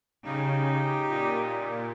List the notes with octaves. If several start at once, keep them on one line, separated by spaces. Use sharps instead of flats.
C#3 D#4 G4
A#2